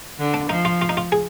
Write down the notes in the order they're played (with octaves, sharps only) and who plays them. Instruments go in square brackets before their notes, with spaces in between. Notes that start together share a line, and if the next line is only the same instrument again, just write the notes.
[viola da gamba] D3
[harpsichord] D4
[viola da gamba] F3 [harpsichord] D#4
[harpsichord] F4
F4
D#4
F4
G#4